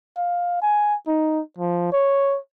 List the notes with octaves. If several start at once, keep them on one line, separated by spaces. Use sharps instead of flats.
F5
G#5
D#4
F3
C#5